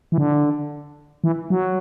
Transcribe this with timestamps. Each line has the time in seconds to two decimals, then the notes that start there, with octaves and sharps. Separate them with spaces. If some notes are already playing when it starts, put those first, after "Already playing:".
0.12 E3
0.18 D3
1.24 E3
1.50 F#3